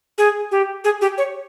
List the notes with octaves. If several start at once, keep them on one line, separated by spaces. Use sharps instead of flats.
G#4
G4
G#4
G4
C#5